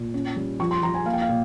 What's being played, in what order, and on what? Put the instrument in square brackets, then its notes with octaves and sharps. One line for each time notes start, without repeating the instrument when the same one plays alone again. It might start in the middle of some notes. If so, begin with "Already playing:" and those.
Already playing: [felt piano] A#2
C#4
G3
F3 C#6
C6
F3 A#5
G#5
A#3 F5
G5
F5
A#2